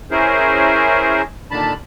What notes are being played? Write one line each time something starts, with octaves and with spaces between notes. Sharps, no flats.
C#4 E4 G#4 A#4 C5
A#2 D3 D#3 D4 A5 B5